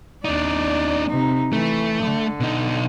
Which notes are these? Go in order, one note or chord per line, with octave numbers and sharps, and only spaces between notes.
D#2 D4 D#4 D5
C3 D#4
E3 A3
D3
B2 D#4